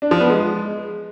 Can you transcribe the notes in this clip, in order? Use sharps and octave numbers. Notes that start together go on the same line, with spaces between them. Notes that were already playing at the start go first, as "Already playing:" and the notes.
D4
F3
B3
G#3